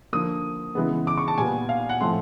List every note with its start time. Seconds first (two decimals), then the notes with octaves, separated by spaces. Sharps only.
0.13 D3 F3 A#3 D#6
0.75 C#3 E3 G#3 B3
1.07 D6
1.17 C#6
1.28 A5
1.38 A#2 G3 B3 G#5
1.69 F5
1.89 F#5
2.01 A2 F3 A3 C4 C6